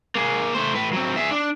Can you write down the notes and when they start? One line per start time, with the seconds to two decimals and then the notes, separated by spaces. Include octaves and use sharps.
0.15 A#3 G#4
0.54 A3 C5
0.75 A2 B4
0.93 F#3 C4
1.16 G#4 E5
1.31 D4